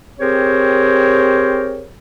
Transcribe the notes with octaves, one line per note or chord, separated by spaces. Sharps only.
C4 G4 G#4 A#4 C5 C#5